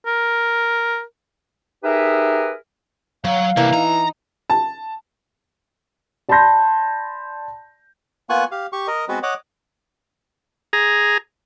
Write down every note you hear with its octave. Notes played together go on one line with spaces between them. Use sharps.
A#4
D#4 G4 G#4 A#4 B4 E5
F#3 C#5 F5
C2 E3 A#3 D4
D#4 A#5
A5
D5 A5 B5 C6 G6 A#6
A#3 B3 F4 F#5 G#5 C#6
G4 F5
G4 C#6
A#4 D#5
G#3 B3 C4 F#4 B4
C#5 D#5 F#5 D6
G#4 A#5